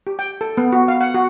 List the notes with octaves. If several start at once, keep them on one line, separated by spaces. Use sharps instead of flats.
G4
G5
A4
B3
F#4
F5
F#5
F#4